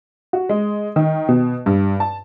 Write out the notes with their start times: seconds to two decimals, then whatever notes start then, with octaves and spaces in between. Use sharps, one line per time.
0.33 F#4
0.49 G#3
0.96 D#3
1.29 B2
1.66 G2
2.00 A5